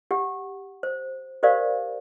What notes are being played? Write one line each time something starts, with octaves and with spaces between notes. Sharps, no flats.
G4 F#5
C5
G4 A#4 C5 D5 F5